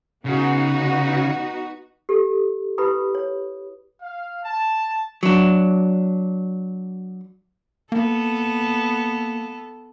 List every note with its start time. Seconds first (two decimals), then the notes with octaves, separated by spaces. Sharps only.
0.25 C#3 B3 D#4 F#4
2.09 G4 A4
2.78 E4 G4 B4 B5 D#6
3.15 C#5
4.02 F5
4.43 A5
5.23 F#3 D4
7.92 A#3 B3 A4